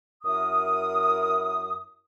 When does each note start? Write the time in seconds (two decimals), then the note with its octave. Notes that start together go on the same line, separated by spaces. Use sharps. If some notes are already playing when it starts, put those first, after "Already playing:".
0.23 F#2 E4 A#4 D#6